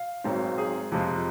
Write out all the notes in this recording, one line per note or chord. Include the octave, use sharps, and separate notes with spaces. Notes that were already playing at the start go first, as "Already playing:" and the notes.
Already playing: F5
G#1 G#2 F#3 C4
G#4
F2 C3 F3 G#3